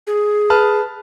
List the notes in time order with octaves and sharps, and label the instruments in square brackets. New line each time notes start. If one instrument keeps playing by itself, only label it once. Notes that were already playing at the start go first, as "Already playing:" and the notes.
[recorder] G#4
[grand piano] B4 A5 F6